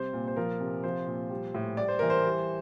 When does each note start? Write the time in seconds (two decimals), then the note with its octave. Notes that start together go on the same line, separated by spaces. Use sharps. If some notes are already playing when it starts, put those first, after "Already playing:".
Already playing: C3 G3 C5
0.13 A#2
0.27 C5
0.36 F3 A#4
0.60 C3
0.83 F3 C5
1.07 A#2
1.30 G3
1.55 A2
1.77 G3 D5
1.88 C5
1.99 E3 A#4
2.10 C5
2.25 G3